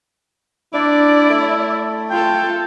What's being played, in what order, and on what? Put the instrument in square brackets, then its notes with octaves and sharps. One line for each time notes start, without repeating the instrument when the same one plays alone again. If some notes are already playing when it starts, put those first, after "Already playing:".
[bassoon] D4 [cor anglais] E4 [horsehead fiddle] D5
[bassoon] A3
[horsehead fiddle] F4 A4 [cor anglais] G5